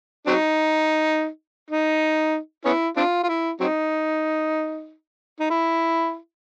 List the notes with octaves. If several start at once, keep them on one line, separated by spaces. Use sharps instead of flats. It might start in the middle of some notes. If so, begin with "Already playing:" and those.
F#3 C4 D#4
D#4
B3 C#4 E4
C4 D4 F4
F4
E4
F#3 C4 D#4
D#4
E4